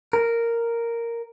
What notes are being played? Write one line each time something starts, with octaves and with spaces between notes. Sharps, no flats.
A#4